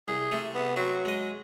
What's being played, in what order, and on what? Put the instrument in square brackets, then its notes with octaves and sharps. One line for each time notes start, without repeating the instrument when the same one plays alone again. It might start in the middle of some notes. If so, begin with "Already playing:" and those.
[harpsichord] C2 [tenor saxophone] G#4
[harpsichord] C3 A3
[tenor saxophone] B3
[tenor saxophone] F#3 [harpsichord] C4
[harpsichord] G#3 D#5